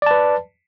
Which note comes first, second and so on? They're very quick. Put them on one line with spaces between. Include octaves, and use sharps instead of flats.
D5 A5 B4